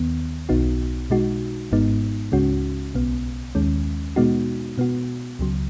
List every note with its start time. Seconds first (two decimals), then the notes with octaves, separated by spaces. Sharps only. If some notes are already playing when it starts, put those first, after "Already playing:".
Already playing: D#2 D#3 B3
0.49 B1 B2 B3 D#4 F#4
1.10 B2 G#3 D#4 F#4
1.71 G#1 G#2 G#3 B3 D#4
2.32 C#2 C#3 G#3 C#4 F#4
2.94 B1 B2 B3
3.55 D#2 D#3 G#3 C#4
4.16 B2 G#3 B3 D#4 F#4
4.78 B2 B3 F#4
5.39 C#2 C#3 F#3